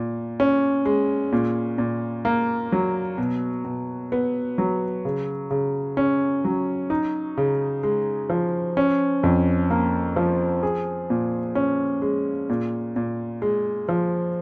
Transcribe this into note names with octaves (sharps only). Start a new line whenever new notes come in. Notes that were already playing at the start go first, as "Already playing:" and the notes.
Already playing: A#2
C#4
G#3
A#2
A#2
A#3
F#3
B2
B2
B3
F#3
C#3
C#3
C#4
F#3
D#4
C#3
G#3
F3
C#4
F2
A#3
F3
G#4
A#2
C#4
G#3
A#2
A#2
G#3
F3